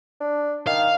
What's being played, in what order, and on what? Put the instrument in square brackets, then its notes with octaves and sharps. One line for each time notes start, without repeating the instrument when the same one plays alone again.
[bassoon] D4
[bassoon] D#3 [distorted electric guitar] F5